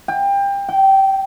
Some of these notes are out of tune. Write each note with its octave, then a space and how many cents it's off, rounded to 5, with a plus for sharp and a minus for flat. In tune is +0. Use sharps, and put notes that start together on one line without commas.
G5 +25
G5 -20